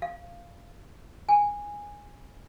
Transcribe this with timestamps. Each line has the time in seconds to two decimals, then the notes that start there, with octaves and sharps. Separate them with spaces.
0.02 F5
1.29 G#5